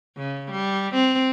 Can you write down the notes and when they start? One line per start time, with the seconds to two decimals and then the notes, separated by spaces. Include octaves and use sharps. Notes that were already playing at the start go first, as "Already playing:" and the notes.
0.17 C#3
0.51 G3
0.95 C4